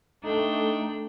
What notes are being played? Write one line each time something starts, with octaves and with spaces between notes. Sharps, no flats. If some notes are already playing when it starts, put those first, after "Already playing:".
A3 D4 D#4 G5